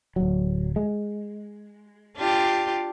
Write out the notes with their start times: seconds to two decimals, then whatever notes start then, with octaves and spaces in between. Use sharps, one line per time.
0.16 D1 F#3
0.76 G#3
2.17 D4 F4 G4